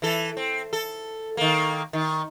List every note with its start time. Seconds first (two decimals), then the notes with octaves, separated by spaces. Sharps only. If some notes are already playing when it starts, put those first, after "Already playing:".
0.02 E3 A4
0.37 C4
0.73 A4
1.37 D#3 A#3
1.93 D#3